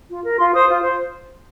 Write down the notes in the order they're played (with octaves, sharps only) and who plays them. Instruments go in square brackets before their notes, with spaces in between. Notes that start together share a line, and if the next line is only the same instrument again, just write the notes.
[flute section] F4
A#4
F4 C6
C5 D#6
F4
C5